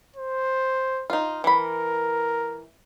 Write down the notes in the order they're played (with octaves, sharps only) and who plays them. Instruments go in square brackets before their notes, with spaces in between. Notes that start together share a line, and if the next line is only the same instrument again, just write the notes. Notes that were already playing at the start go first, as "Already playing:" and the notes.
[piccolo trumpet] C5
[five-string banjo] D#4 F4
[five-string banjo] E3 B5 [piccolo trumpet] A#4